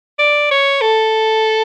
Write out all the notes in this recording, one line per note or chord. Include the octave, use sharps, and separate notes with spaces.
D5
C#5
A4